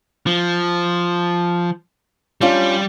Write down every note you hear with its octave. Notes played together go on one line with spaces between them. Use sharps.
F3
G3 C#4 D4 F4